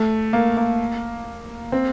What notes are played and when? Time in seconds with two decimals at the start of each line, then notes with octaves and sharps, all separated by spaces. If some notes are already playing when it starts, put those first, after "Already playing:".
Already playing: A3
0.33 A#3
0.57 A#3
1.72 C4